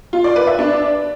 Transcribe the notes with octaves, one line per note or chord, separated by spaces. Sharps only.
F4
D5
B4
E5
D4